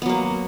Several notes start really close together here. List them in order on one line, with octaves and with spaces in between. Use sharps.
B3 F#3 A#3